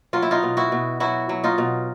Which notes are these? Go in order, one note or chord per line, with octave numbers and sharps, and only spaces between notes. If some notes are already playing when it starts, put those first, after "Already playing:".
F#3 F4
E4
D#4 F4
B2
E4 F#4
B2
F#3 E4 F#4
F#3
D#4 F4
B2